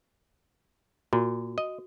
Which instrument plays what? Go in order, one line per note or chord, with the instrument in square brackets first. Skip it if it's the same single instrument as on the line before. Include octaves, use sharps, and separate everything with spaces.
[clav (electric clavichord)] A#2 [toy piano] F#4
[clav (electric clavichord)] D#5